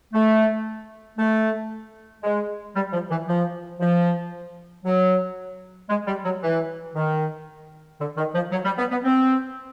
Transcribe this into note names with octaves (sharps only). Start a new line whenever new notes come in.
A3
A3
G#3
G3
F3
E3
F3
F3
F#3
G#3
G3
F#3
E3
D#3
D3
D#3
F3
F#3
G3
B3
B3
C4